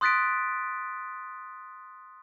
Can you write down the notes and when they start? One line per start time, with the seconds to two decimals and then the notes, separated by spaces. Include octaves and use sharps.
0.01 C6 D#6 F#6 A6 B6 D7